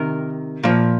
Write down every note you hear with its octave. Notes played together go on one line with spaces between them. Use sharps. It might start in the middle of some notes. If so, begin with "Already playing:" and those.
Already playing: C3 D#3 A#4
A#2 F3